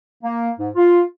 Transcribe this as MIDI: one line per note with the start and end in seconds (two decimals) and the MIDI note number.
0.23 0.50 58
0.59 0.69 44
0.76 1.02 65